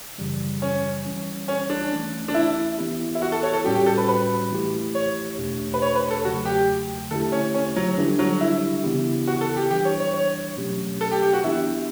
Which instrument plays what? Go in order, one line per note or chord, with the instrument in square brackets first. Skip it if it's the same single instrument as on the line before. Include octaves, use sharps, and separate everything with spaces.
[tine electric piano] F#2 C#3 E3 G3
[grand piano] C#4
[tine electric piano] E3 G3 C#4
[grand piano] C#4
D4
[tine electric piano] E3 A3 C#4
[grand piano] D4
E4
[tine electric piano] E3 B3 E4 G4
[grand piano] E4
F#4
A4
C#5
A4
[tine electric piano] A2 G3 C#4 F#4 [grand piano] G4
[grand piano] G4
A4
B4
B4
[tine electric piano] E3 A3 E4 G4
[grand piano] C#5
[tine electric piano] E2 B2 A3 D4 G4
[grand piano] B4
C#5
B4
A4
[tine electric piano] E2 C#3 F#3 A3 [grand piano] F#4
[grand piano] G4
[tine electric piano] D3 A3 E4 G4 [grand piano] A4
[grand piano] C#4
C#4
F#3
[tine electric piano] D3 G3 D4 G4 [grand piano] E3
[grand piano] F#3
E4
[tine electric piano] C#3 E3 B3 E4 G4
[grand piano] F#4
A4
G4
[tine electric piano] E3 G3 D4 [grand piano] G4
[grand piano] C#5
C#5
C#5
[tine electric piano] B2 F#3 A3 C#4 G4
[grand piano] A4
G4
G4
F#4
[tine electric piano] E3 B3 D4 G4 [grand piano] E4